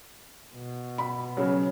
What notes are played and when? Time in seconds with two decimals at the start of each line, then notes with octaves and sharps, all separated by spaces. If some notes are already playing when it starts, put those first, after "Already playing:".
0.54 B2
0.98 B5
1.37 C#3 F#3